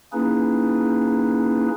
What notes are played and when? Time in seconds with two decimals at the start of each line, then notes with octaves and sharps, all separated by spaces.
0.13 A#3 C#4 D#4 E4 G#4 B4